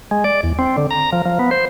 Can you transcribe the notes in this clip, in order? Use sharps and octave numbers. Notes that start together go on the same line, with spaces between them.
G#3
D5
E2
C4
D3
A#5
F3
F3
B3
C5